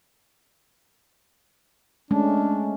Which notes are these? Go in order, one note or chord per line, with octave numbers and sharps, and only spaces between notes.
G#3 A3 C#4 D4